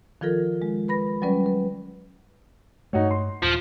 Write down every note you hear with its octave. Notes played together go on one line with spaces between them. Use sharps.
D#3 F3 F4 A4 A#4
G#3
B4 B5 A#6
F#3 G3 C#4 B4 D5
B4
G2 A3 D#4 F#4 C#5
C6
D#1 F3